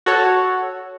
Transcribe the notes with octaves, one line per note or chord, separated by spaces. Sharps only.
F#4 A4 C#5